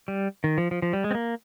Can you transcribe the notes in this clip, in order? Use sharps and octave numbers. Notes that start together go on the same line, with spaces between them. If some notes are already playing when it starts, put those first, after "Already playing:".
G3
D#3
F3
F3
F3
G3
G#3
C4
A#3